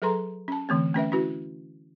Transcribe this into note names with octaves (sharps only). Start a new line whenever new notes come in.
F#3 G#4 A4 B4 A#5 C6
C#4 A5
D3 E3 A3 C4
A3 C#4 B4 E5
C#4 E4 F#4 B4